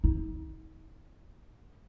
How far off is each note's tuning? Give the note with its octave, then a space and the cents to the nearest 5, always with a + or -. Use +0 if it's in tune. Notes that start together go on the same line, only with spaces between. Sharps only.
D#4 +40